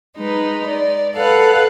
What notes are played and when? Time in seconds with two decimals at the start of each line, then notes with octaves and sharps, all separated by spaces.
0.16 G#3 D#4 B4
0.68 D5
1.15 A4 B4 F5 F#5